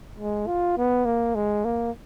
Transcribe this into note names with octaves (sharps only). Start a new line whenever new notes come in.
G#3
F4
B3
A#3
G#3
A#3